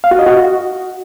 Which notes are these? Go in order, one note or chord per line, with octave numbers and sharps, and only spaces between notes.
F5
F#4
D#5
F#4